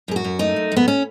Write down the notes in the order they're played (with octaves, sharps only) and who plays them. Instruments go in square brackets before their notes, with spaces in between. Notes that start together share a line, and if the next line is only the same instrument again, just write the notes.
[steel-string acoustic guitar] F#2 G#4
F#4
F#2
A3 D#4
F#2
F#2 B3
C#4